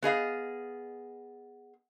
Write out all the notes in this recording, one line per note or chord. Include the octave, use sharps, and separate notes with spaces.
B3 G#4 D#5 F5